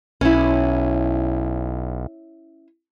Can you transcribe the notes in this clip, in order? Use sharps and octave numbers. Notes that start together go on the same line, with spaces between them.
B1 C#4 E4